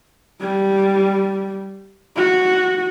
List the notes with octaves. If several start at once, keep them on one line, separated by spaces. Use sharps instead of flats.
G3
F#4